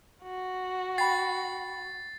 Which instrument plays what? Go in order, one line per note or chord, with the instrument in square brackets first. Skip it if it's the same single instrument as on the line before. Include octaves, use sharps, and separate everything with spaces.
[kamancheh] F#4
[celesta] G5 B5 [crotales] A6 C7